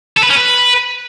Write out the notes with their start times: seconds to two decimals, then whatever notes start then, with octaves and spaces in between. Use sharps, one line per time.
0.17 A4
0.24 B4
0.30 C#4
0.36 B4